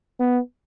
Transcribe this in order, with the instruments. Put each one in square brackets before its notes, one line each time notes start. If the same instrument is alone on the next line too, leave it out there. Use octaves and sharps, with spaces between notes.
[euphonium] B3